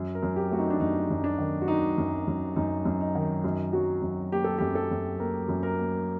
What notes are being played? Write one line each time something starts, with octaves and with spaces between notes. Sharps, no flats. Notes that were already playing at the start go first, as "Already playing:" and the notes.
Already playing: F#2
A#4
F#2
G4
A3 F#4
D#4
D4
F#2 D#4
F#2
D4
D#3
F#4
D#3 D#4
F#2
F#2
F#2 D#4
F#2
D#4
D#3
F#2 D#4
F#3 F#4
F#2
A#3 G4
A4
F#2 G4
A4
F#2
A#3 A#4
F#2
A#4
A#3